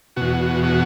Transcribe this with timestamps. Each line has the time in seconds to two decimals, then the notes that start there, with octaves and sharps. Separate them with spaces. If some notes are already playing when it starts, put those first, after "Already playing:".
0.16 E2 B2 F#4
0.64 F#4